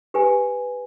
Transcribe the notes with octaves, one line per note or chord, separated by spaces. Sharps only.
G4 B4 G#5